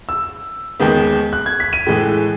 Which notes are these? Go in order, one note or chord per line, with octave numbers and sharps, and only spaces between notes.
E6
D#2 D#3 G#3 B3
F#6
G#6
B6
D#7
A2 E3 G#3